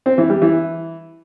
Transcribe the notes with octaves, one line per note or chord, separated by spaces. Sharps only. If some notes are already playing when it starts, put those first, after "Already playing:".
C4
E3
G3
E3